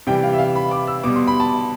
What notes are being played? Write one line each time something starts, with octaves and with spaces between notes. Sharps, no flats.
C3 E3 G3 G5
F5
E5
F5
B5
D6
E6
B2 G3 D6
C6
B5
A5